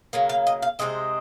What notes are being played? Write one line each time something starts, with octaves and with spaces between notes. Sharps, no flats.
C#3 F#3 A#3
F5
D#5
F5
C3 D#3 G#3 C4 D#5